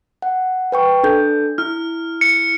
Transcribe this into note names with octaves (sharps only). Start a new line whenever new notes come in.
F#5
B4 G5 C#6
D4 A4 G6
E4 F6
C#7